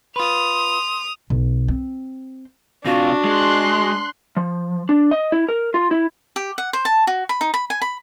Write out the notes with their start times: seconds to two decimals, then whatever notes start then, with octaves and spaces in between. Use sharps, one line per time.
0.16 F4 B4 C6 D#6 F7
1.30 B1
1.68 C4
2.86 C3 D4 F4 F#4
3.25 G#3 C6 F#6
4.37 F3
4.89 D4
5.11 D#5
5.32 E4
5.49 A#4
5.74 F4
5.91 E4
6.36 G4
6.58 F#5
6.73 C5
6.85 A5
7.07 F#4
7.29 B5
7.41 D#4
7.54 B5
7.70 G#5
7.82 B5